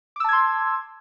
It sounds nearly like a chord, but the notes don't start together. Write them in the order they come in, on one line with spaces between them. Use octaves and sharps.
D6 E6 A5 G#6 C6